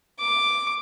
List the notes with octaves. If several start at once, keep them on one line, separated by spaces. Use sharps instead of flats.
D6